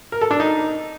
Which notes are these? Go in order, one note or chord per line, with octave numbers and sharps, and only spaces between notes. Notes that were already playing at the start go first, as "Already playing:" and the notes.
A#4
A4
D4
D#4